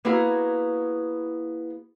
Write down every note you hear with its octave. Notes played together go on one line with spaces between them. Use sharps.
A#3 B3 E4 F#4 G#4 A#5